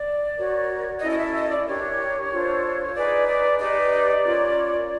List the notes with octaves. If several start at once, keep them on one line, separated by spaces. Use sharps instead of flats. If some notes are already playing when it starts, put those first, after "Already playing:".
Already playing: D5
F#4 A#4 C#5
C#4 E4 A4 D#5
D#5
E5
D#5
D5
D4 G4 A#4 C#5
D4 F4 A4 C5
C#5
D#4 G#4 B4 D5
D5
D#4 G4 B4 D5
C#4 F4 A#4 C#5